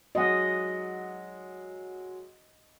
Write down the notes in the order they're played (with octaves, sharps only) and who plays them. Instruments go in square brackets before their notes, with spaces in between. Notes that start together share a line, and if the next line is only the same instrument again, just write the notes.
[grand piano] F#3 G#3 F#5 [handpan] D#5